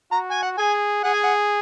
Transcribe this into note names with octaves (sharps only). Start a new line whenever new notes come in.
F#4 A#5
G#5
F#5
G#4 G#5
G#4 F#5
G#5
F#5